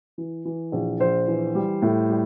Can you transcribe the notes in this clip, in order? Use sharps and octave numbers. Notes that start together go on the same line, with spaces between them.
E3
E3
A#1
A#1 C5
E3
G3
A2
G3